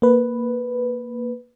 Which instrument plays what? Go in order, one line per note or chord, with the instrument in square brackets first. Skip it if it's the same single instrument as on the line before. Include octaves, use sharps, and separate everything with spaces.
[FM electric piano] A#3 B4